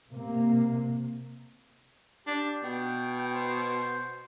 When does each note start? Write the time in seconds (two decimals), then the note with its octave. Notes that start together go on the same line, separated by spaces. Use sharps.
0.10 C3 A#3
2.27 D4 G4
2.63 B2 G5
3.20 G5
3.35 C5